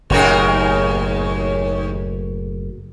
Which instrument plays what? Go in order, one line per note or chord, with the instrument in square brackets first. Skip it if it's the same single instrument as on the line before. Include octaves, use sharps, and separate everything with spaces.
[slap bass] F#1 A2 [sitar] D#2 C#3 A#4